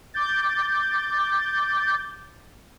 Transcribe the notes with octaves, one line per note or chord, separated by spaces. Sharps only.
D6 G6 A6